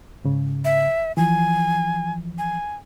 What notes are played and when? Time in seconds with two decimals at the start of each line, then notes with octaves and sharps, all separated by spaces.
0.25 G#2 C#3
0.65 E5
1.17 E3 F3 G#5
2.38 G#5